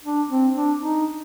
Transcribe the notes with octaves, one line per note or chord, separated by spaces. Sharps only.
D4
C4
D4
D#4